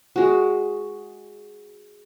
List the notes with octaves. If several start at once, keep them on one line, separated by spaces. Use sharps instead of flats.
G#3 F#4